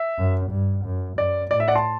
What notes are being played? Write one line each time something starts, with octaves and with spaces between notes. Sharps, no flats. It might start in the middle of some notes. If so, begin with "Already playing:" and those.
Already playing: E5
F#2
G2
F#2
F#2 D5
A2 D5
E5
D5 F#5
A5 C6